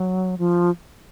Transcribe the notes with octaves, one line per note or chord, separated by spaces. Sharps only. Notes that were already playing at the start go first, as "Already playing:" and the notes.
Already playing: F#3
F3